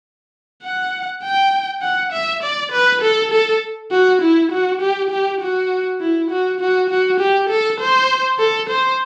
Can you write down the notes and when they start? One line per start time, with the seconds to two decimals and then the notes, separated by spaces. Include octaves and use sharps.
0.63 F#5
1.23 G5
1.82 F#5
2.12 E5
2.42 D5
2.72 B4
3.02 A4
3.31 A4
3.91 F#4
4.22 E4
4.51 F#4
4.81 G4
5.10 G4
5.40 F#4
6.00 E4
6.30 F#4
6.60 F#4
6.89 F#4
7.20 G4
7.49 A4
7.80 C5
8.39 A4
8.69 C5